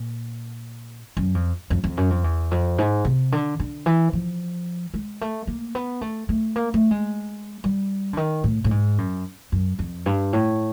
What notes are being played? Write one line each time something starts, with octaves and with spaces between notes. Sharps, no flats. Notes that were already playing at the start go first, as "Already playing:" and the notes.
Already playing: A#2
F#2
F2
F2
F2
F#2
F2
E2
F2
G#2
C3
D3
D3
E3
F3
G#3
A3
A#3
B3
A3
A3
A#3
A3
G#3
G3
D3
D#3
A2
A2
G#2
F#2
F#2
F2
G2
A2